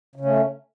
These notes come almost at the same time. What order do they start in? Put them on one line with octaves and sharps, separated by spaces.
C#3 C#4 A3